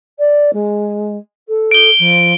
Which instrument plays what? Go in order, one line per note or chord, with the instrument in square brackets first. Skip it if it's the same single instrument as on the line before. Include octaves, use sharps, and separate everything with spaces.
[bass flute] D5
G#3
A4
[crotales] D7 G7
[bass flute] F3